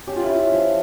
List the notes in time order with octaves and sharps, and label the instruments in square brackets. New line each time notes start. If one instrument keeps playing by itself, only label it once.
[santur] C#4 [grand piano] G4
[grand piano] F4
E4
[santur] C#4 [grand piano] F4
[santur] F3